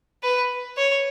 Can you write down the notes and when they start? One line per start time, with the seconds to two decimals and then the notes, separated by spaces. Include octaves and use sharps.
0.23 B4
0.77 C#5